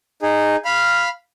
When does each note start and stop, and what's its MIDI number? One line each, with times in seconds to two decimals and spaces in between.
0.22 0.56 63
0.22 0.56 68
0.65 1.09 77
0.65 1.09 83
0.65 1.09 89